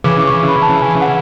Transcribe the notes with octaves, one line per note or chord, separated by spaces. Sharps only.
C#3 E3 D6
D6
C#6
D6
B5
A5
G#5
F#5